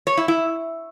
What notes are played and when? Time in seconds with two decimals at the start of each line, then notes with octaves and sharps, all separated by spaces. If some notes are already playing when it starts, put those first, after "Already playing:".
0.07 C#5
0.17 E4
0.28 E4